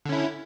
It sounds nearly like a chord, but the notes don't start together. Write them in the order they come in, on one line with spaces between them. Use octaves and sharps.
D3 C#4 E4